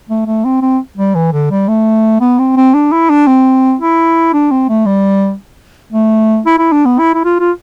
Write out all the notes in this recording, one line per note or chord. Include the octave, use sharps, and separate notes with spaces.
A3
A3
C4
C4
G3
E3
D3
G3
A3
B3
C4
C4
D4
E4
D4
C4
E4
D4
C4
A3
G3
A3
E4
E4
D4
B3
E4
E4
F4
F4